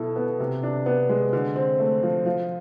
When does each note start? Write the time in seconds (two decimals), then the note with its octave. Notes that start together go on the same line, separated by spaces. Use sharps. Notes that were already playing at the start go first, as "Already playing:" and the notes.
Already playing: B2 E4 A4
0.16 B3
0.40 C3
0.63 D4
0.86 B3
1.09 G#3
1.33 D3
1.56 C4
1.79 A3
2.03 F3
2.26 F3